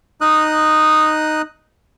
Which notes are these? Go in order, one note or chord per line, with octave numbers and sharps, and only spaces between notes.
D#4 D#6 F#6